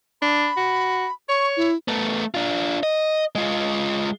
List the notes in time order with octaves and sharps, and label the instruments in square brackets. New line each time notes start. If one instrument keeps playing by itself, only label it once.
[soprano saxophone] D4 [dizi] B5
[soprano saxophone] F#4
[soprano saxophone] C#5 [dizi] C#6
[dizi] E4
[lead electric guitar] A3 B3
D4 F4
D#5
G#3 F4